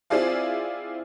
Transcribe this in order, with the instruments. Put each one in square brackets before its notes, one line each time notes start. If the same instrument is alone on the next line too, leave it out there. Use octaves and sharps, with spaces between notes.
[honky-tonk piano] C4 E4 F4 G#4 D5 F5